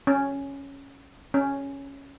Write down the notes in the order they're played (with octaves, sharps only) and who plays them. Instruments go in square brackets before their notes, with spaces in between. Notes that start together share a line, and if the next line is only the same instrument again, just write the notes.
[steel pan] C#4
C#4